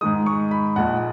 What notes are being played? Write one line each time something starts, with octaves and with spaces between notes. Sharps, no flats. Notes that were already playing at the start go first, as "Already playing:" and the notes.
G#2 D#3 G#3 D#6
C#6
B5
A#1 A#2 G#3 F#5